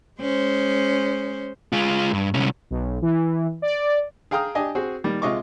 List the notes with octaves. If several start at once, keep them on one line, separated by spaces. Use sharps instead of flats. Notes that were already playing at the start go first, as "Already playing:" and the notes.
G#3 C#4 C5
G#3 F4
G2
C2 C#4
B1
E3
D5
G#4 F5 G5 A#5 D#6 F6
D4 G4 D#5 G#5
C4 F#4 G#4
D#3 G3 A#3
C3 G#3 F4 D#5 C#6 D6